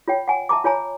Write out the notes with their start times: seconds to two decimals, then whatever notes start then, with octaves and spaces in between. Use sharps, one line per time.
0.08 F4 C#5 G5
0.28 F#5 G#5
0.49 E5 A5 A#5 D6
0.64 F4 C#5 G#5 A#5